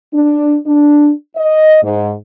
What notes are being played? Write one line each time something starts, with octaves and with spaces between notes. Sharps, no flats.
D4
D4
D#5
G#2